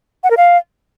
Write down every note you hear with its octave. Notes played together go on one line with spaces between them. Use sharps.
F#5
A#4
F5